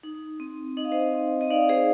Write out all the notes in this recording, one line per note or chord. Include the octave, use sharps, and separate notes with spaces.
D#4
C4
D#4 D#5
F5
C5 D#5
C4
D#5
D#4 D5 F5
G#4 C5